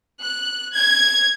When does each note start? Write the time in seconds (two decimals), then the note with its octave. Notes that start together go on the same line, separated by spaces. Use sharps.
0.20 F#6
0.73 G#6